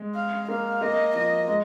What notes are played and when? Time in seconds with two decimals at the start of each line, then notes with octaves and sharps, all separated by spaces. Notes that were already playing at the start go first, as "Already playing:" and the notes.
Already playing: G#3
0.15 F5
0.49 A#3 F5
0.81 A#3 D#5
1.15 F3 D#5
1.47 G#3